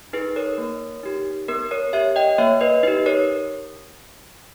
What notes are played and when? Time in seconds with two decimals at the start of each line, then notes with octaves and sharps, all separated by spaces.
0.13 D#4 G#4 B4
0.36 A#4 C#5
0.58 A#3
1.03 D#4 G4
1.48 B3 A#4
1.71 A#4 C#5
1.93 G4 C#5 E5
2.16 D#5 G5
2.38 A#3 C#5 E5
2.61 B4 D#5
2.83 D#4 G4 B4
3.06 A#4 C#5